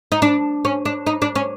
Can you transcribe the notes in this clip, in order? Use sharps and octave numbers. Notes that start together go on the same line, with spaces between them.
D#4
D4
C#4
D4
D#4
D4
C#4